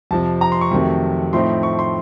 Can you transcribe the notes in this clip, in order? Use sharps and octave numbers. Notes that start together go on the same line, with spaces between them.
F2 C3 F3 A5
A#5
C6
C#6
F2 C3 D#3 F#3 A3
A2 F3 A3 C4 D#4 C6
C#6
C6